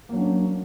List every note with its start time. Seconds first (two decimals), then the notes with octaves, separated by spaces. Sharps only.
0.09 A#3
0.13 F#3
0.16 D4
0.20 C#4